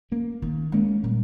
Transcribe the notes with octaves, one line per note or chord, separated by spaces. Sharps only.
A#3 C#4
D#3 A#3
G#3 A#3 C#4
A#2 G3